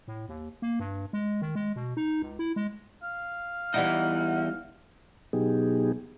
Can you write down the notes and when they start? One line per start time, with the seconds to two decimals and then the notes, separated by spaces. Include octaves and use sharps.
0.08 A2
0.29 D#2
0.62 A#3
0.80 G2
1.13 G#3
1.41 D#3
1.55 G#3
1.76 B2
1.97 D#4
2.22 C#2
2.39 E4
2.56 G#3
3.03 F5
3.74 E2 E3 G3 D#4 E4 F#5
5.33 B2 F#3 B3 D#4 G4 G#4